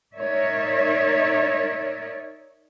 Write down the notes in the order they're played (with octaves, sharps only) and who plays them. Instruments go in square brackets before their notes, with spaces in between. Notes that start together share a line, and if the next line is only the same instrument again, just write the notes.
[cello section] D#4 A#4 C#5 D5 E5